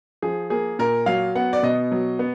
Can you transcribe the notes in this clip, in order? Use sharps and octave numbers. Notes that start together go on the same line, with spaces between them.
F3 G#4
A#3 G#4
A#2 A#4
F#3 F5
B3 F#5
D5
B2 D#5
F#3
B3